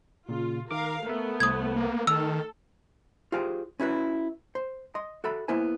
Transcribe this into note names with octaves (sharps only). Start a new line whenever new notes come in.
A#2 C#3 F4
D#3 A#4 F5 D6
A3 B3 A#4 E5
C2 C5 D#6 G#6
A#3
D#3 A4 E6 F6
F4 G4 G#4 C5 F5 G5
C#4 E4 F#4 B4
C5
D#5 C6
F#4 A4 E5 B5
A#3 B3 E4 C5 G#5